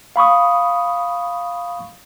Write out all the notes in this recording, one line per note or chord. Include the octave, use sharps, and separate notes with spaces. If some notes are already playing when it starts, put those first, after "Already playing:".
F5 B5 C#6 D#6